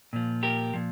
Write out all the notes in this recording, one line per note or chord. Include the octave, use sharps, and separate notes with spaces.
A#2 F3
G4 A#4
A#2 F3